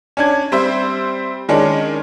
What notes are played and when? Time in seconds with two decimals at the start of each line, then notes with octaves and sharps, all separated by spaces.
0.17 C#4 D4 G#6
0.52 G3 C4 C5 E5
1.49 D#3 G#3 C#4 D4